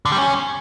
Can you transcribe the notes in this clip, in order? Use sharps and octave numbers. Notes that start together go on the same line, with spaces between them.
D3
G3
C#4